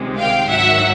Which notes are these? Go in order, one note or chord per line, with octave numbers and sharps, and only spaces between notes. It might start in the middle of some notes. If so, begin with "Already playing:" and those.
Already playing: C#2 C3 D#3 G#3
F5 G5
G#2 D#3 F#3 E5 F#5